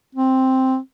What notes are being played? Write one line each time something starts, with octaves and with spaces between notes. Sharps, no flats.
C4